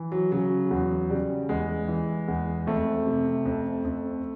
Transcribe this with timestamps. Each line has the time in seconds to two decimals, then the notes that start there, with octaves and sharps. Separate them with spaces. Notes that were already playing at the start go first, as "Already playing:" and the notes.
Already playing: E3
0.12 F#3
0.32 C#3 F#3
0.71 E2
1.10 C#3 G3
1.49 E2 G#3
1.88 E3
2.28 E2
2.67 F2 A3
3.06 C3
3.45 F2
3.85 F2